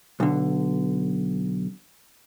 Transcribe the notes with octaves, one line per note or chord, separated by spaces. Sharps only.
B1 D3